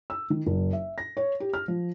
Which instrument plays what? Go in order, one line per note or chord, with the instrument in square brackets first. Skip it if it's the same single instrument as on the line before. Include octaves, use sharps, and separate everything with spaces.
[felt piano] E6
D#3
F#1
E5
A#6
C#5
G4
F6
F3